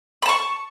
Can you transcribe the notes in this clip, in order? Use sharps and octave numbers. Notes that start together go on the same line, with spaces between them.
A5 B5 C#6